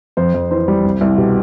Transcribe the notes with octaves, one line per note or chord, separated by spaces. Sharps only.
F2 C5
F2
E3 C5
G3
C2
C2
B2 G4